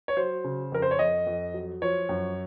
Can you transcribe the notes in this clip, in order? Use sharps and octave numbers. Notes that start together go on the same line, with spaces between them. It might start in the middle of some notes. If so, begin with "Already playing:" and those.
C#5
F#3 C5
C#3
F2 A#4
C5
C#5
F2 D#5
F2
F#3
F3 C#5
F#2